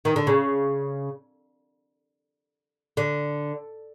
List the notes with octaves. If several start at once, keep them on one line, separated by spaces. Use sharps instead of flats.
D#3
D3
C#3
D3